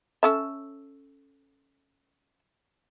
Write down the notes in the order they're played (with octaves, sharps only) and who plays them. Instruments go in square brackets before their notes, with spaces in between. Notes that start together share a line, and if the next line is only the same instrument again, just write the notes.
[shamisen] C#4 A4 E5